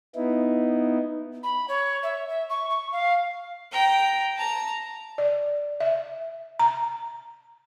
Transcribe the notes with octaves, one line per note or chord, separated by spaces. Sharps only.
B3 D#4 E4
B5
C#5
E5
E5
C#6
C#6
F5
G5 A#5
A5 A#5
D5
E5
A#5